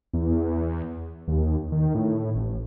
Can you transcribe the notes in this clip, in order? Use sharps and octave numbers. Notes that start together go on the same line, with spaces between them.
E2
D#2
D#3
A2
A1